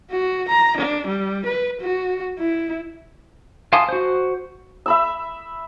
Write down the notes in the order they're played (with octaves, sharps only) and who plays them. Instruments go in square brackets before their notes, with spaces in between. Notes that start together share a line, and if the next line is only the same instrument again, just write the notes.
[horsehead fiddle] F#4
A#5
D4
G3
B4
F#4
E4
[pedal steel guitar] F5 G#5 A5 C6 D#6
F#4 C5
[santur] E5 B5 E6